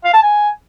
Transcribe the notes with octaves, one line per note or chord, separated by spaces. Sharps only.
F5
A5
G#5